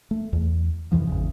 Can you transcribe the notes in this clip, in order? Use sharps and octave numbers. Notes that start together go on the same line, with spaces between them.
A3
E2
C2 F2 E3 F3
G#1 E2 C#3